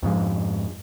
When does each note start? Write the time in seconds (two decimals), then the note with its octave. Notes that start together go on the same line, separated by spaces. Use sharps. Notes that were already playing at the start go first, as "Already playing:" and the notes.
0.03 F2 G#2 F3 G#3